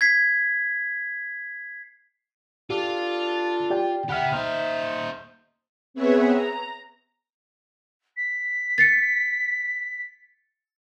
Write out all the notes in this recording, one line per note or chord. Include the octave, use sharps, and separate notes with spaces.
G#6 B6 C7
D4 F4 G4 A4
G4 D5 G5
D#2 G4 E5 F#5 G5 B5 F6
A#3 D#4 C5 E5 F6
B3 C4 G#4 B4 C#5 E5
A#5
B6
A6 C7 C#7